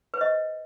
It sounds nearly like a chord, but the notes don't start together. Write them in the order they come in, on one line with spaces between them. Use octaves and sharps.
B4 C5 D#5